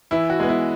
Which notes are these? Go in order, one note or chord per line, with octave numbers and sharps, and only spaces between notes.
E3 E4
F#4
G#3 B3
E4